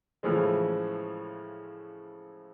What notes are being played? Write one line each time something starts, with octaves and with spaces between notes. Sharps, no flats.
A2 C#3 E3 F3 G#3